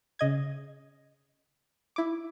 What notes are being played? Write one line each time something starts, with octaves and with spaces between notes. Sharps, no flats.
C#3 D#5 G#6
E4 D6